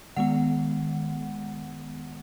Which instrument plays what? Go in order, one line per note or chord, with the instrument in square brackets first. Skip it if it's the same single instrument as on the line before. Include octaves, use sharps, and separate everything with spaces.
[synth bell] D#3 G#3 B3 F#5